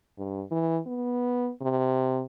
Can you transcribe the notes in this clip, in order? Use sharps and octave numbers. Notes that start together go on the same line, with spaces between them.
G2
E3
B3
C3